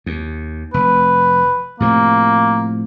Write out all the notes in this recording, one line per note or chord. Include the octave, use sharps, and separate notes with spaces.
D#2
F1 B4
A2 C3 F3 A#3